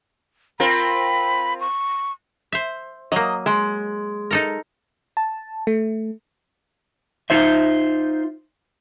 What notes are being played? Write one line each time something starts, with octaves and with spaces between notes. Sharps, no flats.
C4 F4 A#4 B5
C#6
C5 E5
F#3 A#3 D#5
G#3
D#4 A4 A#4
A5
A3
D#4 F4 C5 E5